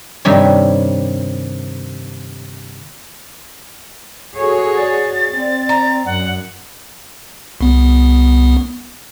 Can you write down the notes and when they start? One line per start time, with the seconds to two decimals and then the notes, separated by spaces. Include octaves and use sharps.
0.25 G2 C3 D#3 G3 C#5
4.36 F#4 G#4 A4 C#5
4.77 D5 A6
5.29 C4
5.69 A#5
6.06 F#2 F#5
7.61 C2 B3